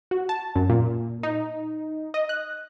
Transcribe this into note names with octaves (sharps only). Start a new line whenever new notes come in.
F#4
A5
F#2
A#2
D#4
D#5
F#6